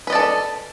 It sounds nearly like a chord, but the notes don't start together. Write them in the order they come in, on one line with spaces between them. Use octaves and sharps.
B4 D#5 D5 A4